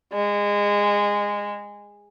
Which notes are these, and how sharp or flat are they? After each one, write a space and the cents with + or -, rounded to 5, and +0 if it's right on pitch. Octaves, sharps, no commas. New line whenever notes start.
G#3 -20